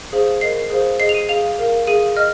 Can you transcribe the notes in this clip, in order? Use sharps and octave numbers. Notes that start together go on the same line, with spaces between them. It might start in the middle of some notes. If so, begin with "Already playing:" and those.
G#4 C5 F5
A#4 D#5 C7
G#4 C5 F5
G#4 D#5 C7
F7
D#7
G#4 F5 F7
A#4 F5
G#4 F5 D#7
D#5 F6